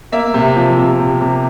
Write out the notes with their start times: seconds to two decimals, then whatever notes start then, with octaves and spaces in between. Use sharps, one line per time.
0.12 A#3 E5
0.34 C3
0.56 F3
0.78 C3
0.99 C3
1.20 C3